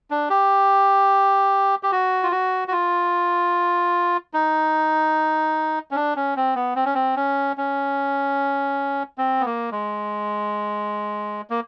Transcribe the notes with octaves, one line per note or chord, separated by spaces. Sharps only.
D4
G4
G4
F#4
F4
F#4
F#4
F4
D#4
C#4
D4
C#4
C4
B3
C4
C#4
C4
C#4
C#4
C4
B3
A#3
G#3
A#3